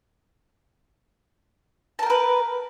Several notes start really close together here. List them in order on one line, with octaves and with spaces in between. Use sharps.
A5 A#4 G5 B4